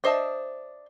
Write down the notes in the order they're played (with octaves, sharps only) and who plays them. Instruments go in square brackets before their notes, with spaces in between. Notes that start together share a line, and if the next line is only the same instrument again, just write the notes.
[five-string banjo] D4 C5 D#5 E5 A5